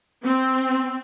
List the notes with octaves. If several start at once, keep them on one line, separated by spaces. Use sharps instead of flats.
C4